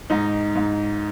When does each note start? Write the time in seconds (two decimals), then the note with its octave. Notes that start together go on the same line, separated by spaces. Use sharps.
0.10 G#2 D#4
0.55 G#2